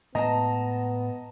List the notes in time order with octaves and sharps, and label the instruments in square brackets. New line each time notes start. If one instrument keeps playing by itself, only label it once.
[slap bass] A2 G#3 [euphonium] B3 [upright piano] D#5 [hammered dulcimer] A5 A#5